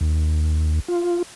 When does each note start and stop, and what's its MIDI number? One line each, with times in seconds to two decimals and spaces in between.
0.01 0.80 39
0.88 1.22 65